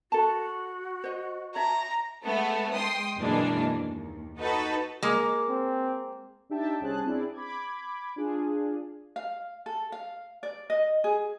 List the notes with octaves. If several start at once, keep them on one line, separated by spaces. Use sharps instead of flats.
F#4 A4 A5
C5 D#5
C#5 E5 A5 A#5
G#3 A3 B3 A4
G#3 G5 C6 D#6
F#2 B2 E3 G#3 A#3 D4
D#2
D#4 F#4 A4 B4
G#3 A#3
C4
D4 D#4 G4 E5 G5 A5
C2 C#4 G#4 C5 A5 F#6
C4 D4 E4 G#4 D5
B5 D6 G#6
D4 F4 G#4
F5
A4
F5
D5
D#5
G#4